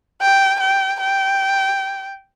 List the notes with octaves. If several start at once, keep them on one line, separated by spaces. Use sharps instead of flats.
G5
G5
G5